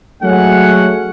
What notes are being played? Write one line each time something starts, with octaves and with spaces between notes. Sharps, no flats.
F#3 G#3 A3 C#4 C#5 F#5